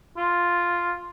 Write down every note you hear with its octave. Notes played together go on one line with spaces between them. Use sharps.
F4